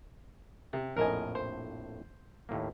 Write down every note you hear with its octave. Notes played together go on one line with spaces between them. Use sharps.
C3
A#1 F2 A2 A#4 D#5 G#5
C5
D#2 A2 A#3